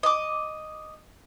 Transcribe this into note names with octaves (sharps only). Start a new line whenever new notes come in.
D#5 D6